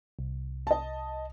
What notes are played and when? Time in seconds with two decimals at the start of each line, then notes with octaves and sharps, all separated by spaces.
0.19 C2
0.67 D#5 A5